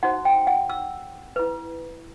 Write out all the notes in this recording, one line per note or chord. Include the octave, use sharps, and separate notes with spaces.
D#4 F#4 C5 F#5
G5
F#5
E6
E4 B4